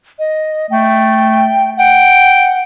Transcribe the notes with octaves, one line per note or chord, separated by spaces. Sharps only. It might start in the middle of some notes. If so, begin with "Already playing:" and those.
D#5
A3 G5
F#5 G5